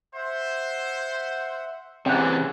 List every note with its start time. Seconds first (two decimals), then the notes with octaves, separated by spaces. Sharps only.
0.15 C5 E5 F#5
2.06 C3 E3 C#4 G#4 F#5